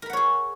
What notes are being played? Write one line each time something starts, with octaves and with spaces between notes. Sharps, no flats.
G#4 A#4 C#5 F#5 B5